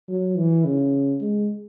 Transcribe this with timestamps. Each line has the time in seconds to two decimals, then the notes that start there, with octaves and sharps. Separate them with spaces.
0.09 F#3
0.37 E3
0.65 C#3
1.21 G#3